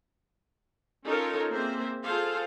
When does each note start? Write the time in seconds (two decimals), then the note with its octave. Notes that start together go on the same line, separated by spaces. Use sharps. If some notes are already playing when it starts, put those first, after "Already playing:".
1.05 C#4 D#4 F4 A4 A#4 C#5
1.50 A#3 C4 G#4 C5 E5
2.03 F4 G#4 A4 C5 F5